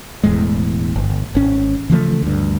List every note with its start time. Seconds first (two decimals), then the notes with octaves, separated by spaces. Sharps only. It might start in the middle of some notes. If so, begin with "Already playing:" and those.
0.23 E1 E2 A2 G#3
0.96 G1
1.35 G#1 C#4
1.90 C#3 E3 F3 A3
2.22 D2 G2